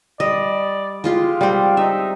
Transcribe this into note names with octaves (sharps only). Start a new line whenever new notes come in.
G3 D5 D#5
G#3 F4 G4 F5
G3 C4 D5
D#4 E5